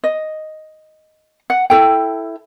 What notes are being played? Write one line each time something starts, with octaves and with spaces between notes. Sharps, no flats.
D#5
F#5
E4 A4 G5